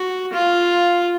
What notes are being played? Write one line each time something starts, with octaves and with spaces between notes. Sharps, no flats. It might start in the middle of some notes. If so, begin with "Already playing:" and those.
Already playing: F#4
F4